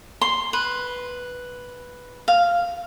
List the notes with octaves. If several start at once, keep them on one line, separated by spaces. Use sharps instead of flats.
C6
B4
F5